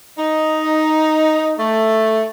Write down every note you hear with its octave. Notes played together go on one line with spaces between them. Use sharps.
D#4
A3